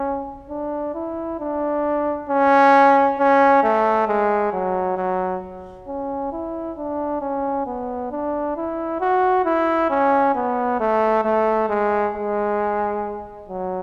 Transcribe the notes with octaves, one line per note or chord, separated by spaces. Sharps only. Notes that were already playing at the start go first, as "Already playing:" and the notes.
Already playing: C#4
D4
E4
D4
C#4
C#4
A3
G#3
F#3
F#3
C#4
E4
D4
C#4
B3
D4
E4
F#4
E4
C#4
B3
A3
A3
G#3
G#3
F#3